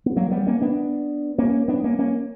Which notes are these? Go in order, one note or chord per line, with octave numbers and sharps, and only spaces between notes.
B3
F#3 A#3
G3 B3
A#3 C#4
B3 D4
A#3 C#4
B3 D4
A#3 C#4
A#3 C#4